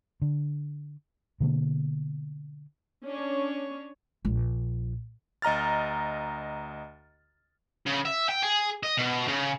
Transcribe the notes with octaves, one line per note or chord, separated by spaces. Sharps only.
D3
B2 D3 A#3
C#4 D4 C#5
A#1
D2 D#5 A#5 F6 A6
C#3
E5
G5
G#4
D#5
B2
C#3